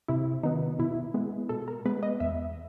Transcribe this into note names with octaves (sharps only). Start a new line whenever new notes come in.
C3 E4
D#3 F#3 B3 D#4
B2 E4
G#3 B3
B2 A4
A#4
G#3 B3 B4
D#5
E2 E5